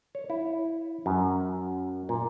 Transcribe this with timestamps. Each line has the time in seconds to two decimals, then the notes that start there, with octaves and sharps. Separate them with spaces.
0.15 C#5
0.30 E4
1.06 F#2
2.09 A#2